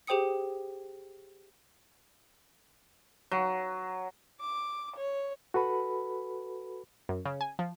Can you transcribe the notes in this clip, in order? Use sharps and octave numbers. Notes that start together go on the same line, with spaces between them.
G4 G#4 C5 G5 D#6 C#7
F#3
D6
C#5
F#4 A4 B4 B5
F#2
C#3
G#5
F3